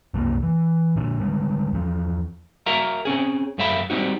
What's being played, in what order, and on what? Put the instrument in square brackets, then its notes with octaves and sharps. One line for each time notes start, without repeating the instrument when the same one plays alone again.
[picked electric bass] C2 F#2 F#3 A#3
E3
A#2 D3
D3 G3 G#3
E2 F3
[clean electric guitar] F#4 A#4 E5 F5 A#5
C4 C#4 G#4
F#2 A3 E5 F5 B5
G3 C4 D#4 F#4